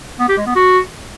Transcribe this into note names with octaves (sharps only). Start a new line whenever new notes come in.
B3
G4
G#3
B3
F#4